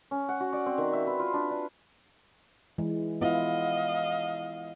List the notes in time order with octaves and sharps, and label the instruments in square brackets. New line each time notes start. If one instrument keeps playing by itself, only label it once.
[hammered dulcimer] C#4
F#5
F#4
D5
C4
D#3
E5
B4
F4
D4
D4
[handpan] E3 G#3
[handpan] B3 E4 F4 [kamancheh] D#5 F5